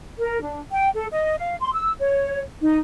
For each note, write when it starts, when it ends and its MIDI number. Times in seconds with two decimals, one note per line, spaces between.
0.18 0.40 70
0.41 0.59 62
0.71 0.89 79
0.95 1.07 69
1.12 1.38 75
1.39 1.55 77
1.61 1.74 84
1.74 1.93 88
2.00 2.40 73
2.60 2.77 63